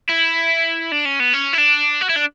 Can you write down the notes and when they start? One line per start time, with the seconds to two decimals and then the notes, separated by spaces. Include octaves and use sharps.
0.09 E4
0.92 D4
1.05 C#4
1.20 B3
1.34 C#4
1.54 E4
1.58 D4
2.02 F#4
2.10 E4
2.16 D4